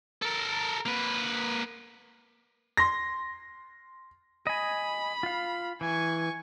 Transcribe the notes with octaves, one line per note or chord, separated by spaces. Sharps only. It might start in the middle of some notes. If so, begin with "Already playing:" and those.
A4 A#4
A#3 B4
C6 A#6
D#5 G#5 B5
F4 F5
E3 G#5 C#6